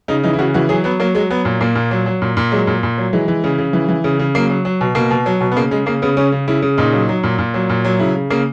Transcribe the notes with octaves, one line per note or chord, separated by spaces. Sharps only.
C#3 D#4
E3 D#4
E4
C#3 F#4
E3 F#4
F#3 G#4
F#3 B3
F#3 A#3
F#3 G#3
F#3 B3
A#2
A#2 A#3
A#2
F#3
F#3
A#2
A#2
F#3 G#3
A#2
A#2
F#3
E3 G#3
E3
C#3
C#3
E3
E3
C#3
C#3
F#3 A#3
F#3
F#3
B2
B2 A#3
B2
F#3
B2
B3
C#3 A#3
C#3 G#3
C#3 A#3
C#3 B3
C#3 C#4
C#3
C#3 E4
C#3
A#2 D#4
F#3
F#3
A#2
A#2
F#3
A#2
F#3
C#3 E4
C#3
C#3 A#3